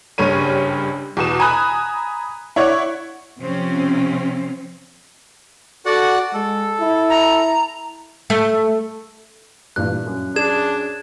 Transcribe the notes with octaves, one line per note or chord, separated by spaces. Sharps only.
F#1 G2 G3 C#5 D#7
E2 B2 E7
G#5 A#5 B5 D#6 F#6
E4 C#5 D5 F#5
C3 F3 C4 C#4
F#4 A4 D5 F#5
G#3 A4
E4
A#5
A3
G2 A#2 E3 F#6
F#2
D4 G#4 G#6 E7